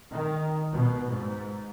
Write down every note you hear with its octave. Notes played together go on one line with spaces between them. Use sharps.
D#3
B2
G#2